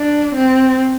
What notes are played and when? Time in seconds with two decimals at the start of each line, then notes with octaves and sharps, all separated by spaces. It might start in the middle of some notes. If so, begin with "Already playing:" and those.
Already playing: D4
0.35 C4